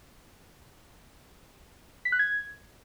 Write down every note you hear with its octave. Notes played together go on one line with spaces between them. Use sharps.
B6
F#6
G#6